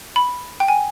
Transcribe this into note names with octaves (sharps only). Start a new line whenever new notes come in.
B5
G5
G#5